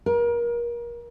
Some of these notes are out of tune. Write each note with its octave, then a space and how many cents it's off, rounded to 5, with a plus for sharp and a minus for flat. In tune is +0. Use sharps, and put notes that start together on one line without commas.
A#4 +30